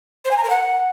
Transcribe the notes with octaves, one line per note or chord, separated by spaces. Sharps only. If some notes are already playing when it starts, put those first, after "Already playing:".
C5
G#5
A#5
A#4
F#5